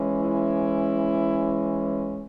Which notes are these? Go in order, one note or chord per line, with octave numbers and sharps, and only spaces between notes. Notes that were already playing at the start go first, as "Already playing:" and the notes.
Already playing: E3 G#3 C#4
E4